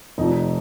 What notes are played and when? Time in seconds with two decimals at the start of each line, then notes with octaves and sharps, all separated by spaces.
0.18 F1 F2 F3 D#4